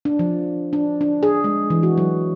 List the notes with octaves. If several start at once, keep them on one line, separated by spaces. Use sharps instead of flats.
D4
F3
D4
D4
G#4
G#3
E3
F#4
F#3